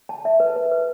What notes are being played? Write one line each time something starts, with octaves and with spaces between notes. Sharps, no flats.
A5
E5
B4
B4
B4